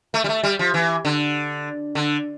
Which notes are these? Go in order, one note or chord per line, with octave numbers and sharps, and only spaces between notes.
A3
G3
A3
G3
F3
E3
D3
D3